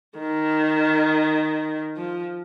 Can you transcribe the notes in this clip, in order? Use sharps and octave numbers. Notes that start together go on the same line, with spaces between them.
D#3
F3